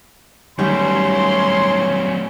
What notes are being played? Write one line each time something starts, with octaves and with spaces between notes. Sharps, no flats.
D#3 F#3 G3 A3 C#4 C6